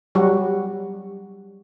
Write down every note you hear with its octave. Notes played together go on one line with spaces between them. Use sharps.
F#3 G3 F#4